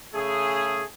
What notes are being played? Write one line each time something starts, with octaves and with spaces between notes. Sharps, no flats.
C#3 A3 G#4